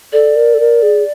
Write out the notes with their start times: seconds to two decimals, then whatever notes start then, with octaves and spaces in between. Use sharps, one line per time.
0.12 A4 D5
0.36 A#4
0.54 A4
0.60 A#4
0.82 G#4